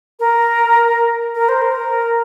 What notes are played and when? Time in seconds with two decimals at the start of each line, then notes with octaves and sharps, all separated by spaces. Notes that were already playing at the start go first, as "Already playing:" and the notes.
0.20 A#4
1.35 A#4
1.49 C5
1.62 A#4